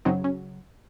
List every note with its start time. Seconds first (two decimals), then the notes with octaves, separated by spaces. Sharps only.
0.05 F#2 C#3 F#3 C4 D#4
0.24 C#4